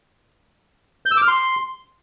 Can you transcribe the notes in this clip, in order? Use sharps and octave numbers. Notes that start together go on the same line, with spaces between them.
G6
E6
D6
F6
C6